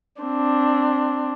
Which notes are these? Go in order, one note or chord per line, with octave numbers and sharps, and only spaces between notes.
C4 D4